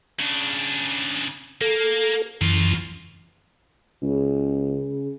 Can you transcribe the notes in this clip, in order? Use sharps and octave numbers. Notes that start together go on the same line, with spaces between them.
C#3 D4
A#3 A4
F#2 C#3 E3 F4
C#2 C#3